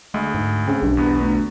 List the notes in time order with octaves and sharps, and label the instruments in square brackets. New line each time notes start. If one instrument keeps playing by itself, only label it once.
[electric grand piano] D2 [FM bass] G#3
[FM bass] G#2
[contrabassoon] C#3 [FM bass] C4
[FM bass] B1 [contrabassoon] G2
[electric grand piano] E2 B3
[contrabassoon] D2